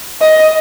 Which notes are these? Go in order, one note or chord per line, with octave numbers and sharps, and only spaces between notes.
D#5